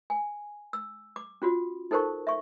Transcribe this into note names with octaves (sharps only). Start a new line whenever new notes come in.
G#5
E6
D6
C#4 F4 F#4
D#4 A4 A#4 C5 A5 C#6
E5 C#6